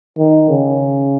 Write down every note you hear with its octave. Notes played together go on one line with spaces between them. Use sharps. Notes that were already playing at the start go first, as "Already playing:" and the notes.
D#3
C#3